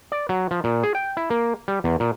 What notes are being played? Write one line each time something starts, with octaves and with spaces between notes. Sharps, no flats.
D5
F#3
F3
A#2
G#4
G5
E4
A#3
G3
E2
A#2